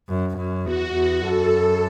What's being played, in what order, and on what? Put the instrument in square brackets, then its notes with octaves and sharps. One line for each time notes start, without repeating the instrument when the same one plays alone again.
[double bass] F#2
F#2
[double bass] E2 [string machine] F#4
[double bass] E2
[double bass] F#2 [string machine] A4